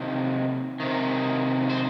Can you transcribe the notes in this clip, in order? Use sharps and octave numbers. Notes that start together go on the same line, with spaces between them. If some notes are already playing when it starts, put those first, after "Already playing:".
Already playing: C3 D#3
C3 D#3
C5